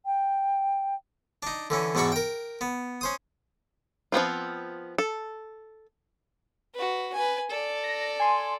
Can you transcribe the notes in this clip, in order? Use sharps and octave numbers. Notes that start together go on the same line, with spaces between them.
G5
D4 D#4
D3 E3 C#4
E2 G#2 D4 F#4 B5 C#6
A#4 G5
B3
C#4 C5 D#6
F3 B3 C4 F4
A4
F#4 B4
B4 G#5
A4 D5
A#6
G#5 C6